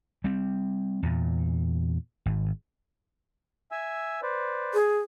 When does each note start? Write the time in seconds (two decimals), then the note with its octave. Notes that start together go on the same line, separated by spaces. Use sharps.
0.24 G3 C4
1.03 E2 A#2
2.26 G#1
3.72 E5 G#5 E6
4.22 B4 C5 D5
4.74 G#4